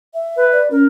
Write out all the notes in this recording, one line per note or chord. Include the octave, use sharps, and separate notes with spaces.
E5
B4
D5
C#4 A#4